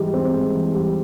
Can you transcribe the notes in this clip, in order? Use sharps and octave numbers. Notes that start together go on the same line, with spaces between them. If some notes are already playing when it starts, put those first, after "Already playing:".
Already playing: G#2 E3 G3
C4
G#2
E3
G3